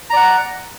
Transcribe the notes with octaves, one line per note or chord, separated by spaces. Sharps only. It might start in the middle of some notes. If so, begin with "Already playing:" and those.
D5 F#5 A#5